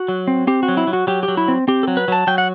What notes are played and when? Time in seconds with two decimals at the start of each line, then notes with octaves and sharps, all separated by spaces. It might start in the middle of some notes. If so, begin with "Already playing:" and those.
Already playing: F#4
0.08 F#3
0.28 C4
0.47 C4 G4
0.63 F#4
0.68 F#3
0.77 E4
0.87 F#3
0.93 F#4
1.07 F#3 G4
1.23 G4
1.28 F#3
1.37 E4
1.48 C4
1.68 C4 G4
1.83 A4
1.88 F#3
1.97 B4
2.08 F#3 A5
2.27 F#3 G5
2.38 F#5